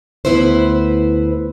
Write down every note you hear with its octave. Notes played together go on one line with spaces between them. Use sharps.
D2 B3 E4 B4 C5